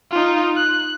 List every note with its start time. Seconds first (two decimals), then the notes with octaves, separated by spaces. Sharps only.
0.11 D#4 F4
0.57 F#6